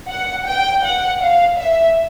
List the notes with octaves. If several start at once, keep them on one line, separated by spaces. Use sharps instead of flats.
F#5
G5
F#5
F5
E5